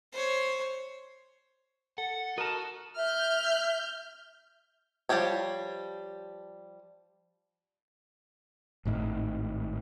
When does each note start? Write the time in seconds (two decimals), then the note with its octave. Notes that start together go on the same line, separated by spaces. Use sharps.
0.13 C5 C#5
1.98 A4 F#5
2.38 F#4 A#4 D#5 A5
2.96 E5 F6 G6
5.09 F3 G3 C#4 G4 C#5
8.85 G#1 A2 D#3